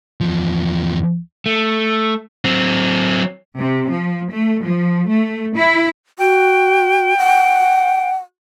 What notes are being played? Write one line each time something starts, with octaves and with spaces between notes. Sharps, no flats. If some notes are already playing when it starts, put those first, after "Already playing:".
E2 F3
A3
F#3 C4
C3
F3
A3
F3
A3
E4
F#4 G5
F#5